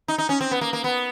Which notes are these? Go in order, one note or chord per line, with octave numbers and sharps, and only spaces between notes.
D#4
D#4
C#4
C4
B3
A#3
A#3
B3